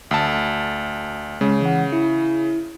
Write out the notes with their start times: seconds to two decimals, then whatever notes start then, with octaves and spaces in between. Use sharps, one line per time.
0.11 D2 A5
1.41 C#3 G#3
1.61 E3 F#5
1.93 E4